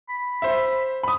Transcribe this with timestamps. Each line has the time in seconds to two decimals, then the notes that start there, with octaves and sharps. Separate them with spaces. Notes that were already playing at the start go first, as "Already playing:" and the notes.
0.09 B5
0.42 C5 E5
1.03 B5 D#6